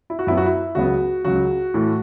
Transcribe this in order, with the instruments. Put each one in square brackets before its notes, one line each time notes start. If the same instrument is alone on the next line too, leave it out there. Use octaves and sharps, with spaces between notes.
[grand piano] E4
F#4
F#2 F#3 B3 E4
F#4
E4
C#2 C#3 F#3 B3 F#4
C#2 C#3 F#3 F#4
A2 E3 A3